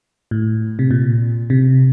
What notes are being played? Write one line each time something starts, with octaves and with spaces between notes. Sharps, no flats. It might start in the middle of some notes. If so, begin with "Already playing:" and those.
A2
C3
A#2
C3